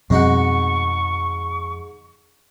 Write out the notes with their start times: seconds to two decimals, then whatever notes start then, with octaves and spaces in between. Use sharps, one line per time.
0.10 F2 G#2 B2 G3 C4 D#4 F#4 C#6